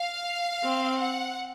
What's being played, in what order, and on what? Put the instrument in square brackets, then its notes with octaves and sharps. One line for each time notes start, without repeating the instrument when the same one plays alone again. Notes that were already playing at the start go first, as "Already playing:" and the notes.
Already playing: [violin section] F5
[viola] C4
[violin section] F#5